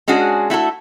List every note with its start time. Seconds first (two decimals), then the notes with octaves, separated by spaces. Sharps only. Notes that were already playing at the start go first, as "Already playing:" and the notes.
0.08 G#3 C#4 D4 F#4 G#4
0.50 A3 E4 F#4 A4